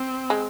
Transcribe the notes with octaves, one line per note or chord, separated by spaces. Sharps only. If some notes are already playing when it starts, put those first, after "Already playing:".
Already playing: C4
G#3